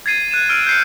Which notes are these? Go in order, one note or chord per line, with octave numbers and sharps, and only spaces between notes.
G#6 A6 C7 D#7
F#6 D#7 E7
E6 F6 D7 D#7
G6 C7 C#7